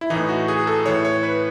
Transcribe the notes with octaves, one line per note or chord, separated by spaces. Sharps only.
E4
A2 E3 D#4
F#4
G#4
A4
A2 E3 C#5
C#5
B4